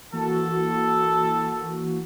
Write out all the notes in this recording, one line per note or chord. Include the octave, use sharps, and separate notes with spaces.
E3 A#3 F#4 A4